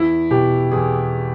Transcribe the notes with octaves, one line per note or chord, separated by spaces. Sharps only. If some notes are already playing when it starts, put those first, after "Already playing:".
Already playing: E2 E4
B2 G4
E2 G#4